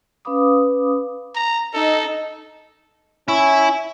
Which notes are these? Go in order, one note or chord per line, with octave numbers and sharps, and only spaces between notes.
C#4 B4 F5 B5 D6 D#6
A#5
D#4 A4 D#5
C#4 E4